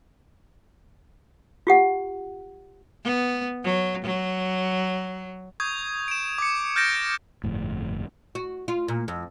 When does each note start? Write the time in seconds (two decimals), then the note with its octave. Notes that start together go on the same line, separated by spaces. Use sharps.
1.67 F4 G4 F#5
3.04 B3
3.64 F#3
4.04 F#3
5.60 C#6 D#6 G6 G#6
6.08 D7 E7
6.38 D6 C#7
6.76 F6 G6 A6 A#6 D7
7.44 G1 F2 A2
8.35 F#4
8.68 F4
8.88 A#2
9.08 F2